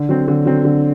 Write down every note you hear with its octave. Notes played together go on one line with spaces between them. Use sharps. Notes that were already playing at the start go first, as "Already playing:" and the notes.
Already playing: D3
F#3 C4
D3
F#3 C4
D3